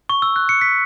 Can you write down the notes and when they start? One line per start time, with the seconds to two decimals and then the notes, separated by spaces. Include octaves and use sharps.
0.10 C#6
0.22 E6
0.36 F#6
0.49 C#7
0.61 B6